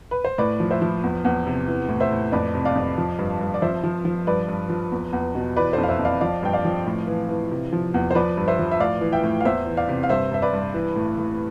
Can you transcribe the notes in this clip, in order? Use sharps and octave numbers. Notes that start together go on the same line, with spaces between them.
B4
C5
A2 B4 D5
F3
C5 E5
F3
E2
E2
C3
E3
A2
C5 E5
A2
F2 B4 D5
C3
D5 F5
F2
F3
G2
G2
D5
F3 C5 E5
F3
F3
G2 B4 D5
G2
F3
E2
E2
B2
E3 B4 D5
F2 A4 C5
F5
C5 E5
F2
D5 F5
F3 D5 F5
G2 G5
D5 F5
F3
A2
E3
E3
C3
F3
E2
C5
F3 B4 D5
G2
C5 E5
F3
E5
A2 D5 F5
E3
E5 G5
A2
F5
E2 C5 E5
E3
D5 F5
C3
F5
G2 C5 E5
G2 E5
B4 D5
G2
E3
A2
A2